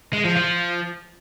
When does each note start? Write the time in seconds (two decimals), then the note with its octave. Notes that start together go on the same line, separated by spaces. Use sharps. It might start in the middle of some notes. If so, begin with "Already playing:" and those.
0.13 G#3
0.25 F3
0.36 F3